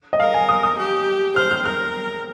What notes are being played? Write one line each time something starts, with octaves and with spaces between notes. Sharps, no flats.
D#5
A#4 F5
G#5
D#6
D#6
G4
C5 F6
F6
A#4 F6